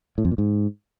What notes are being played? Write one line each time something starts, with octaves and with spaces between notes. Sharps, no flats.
A2
F2
A#2
G#2